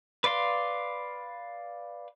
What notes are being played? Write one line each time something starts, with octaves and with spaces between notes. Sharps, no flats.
B4 D5 F5 C6